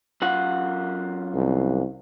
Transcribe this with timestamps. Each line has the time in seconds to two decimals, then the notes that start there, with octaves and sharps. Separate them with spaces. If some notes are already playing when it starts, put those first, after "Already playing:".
0.22 F#2 F4 F#5
1.34 C2